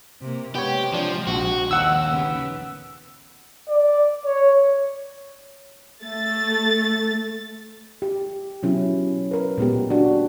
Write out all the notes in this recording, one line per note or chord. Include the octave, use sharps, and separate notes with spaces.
C3 A#3
C3 G#3 B3 G4 C#5
F3 D4
A#1 F#4
D#2 F#5 E6
C#3 B3
D5
C#5
A3 A6
G4
B2 F#3 C#4 E4
A#4 B4
A#2 G#3 B3 G4
D4 F#4 G4